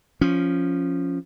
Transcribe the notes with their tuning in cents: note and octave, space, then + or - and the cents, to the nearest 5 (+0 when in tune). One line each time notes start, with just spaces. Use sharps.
F3 +0 C#4 +0